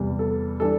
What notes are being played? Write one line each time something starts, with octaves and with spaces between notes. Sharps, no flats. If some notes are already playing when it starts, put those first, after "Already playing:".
Already playing: E2 C3 G3
A4
E3 G3 D4 A4